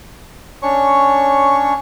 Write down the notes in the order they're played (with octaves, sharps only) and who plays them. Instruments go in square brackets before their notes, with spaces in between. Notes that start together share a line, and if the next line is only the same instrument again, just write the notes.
[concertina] C#4 D4 C#5 C#6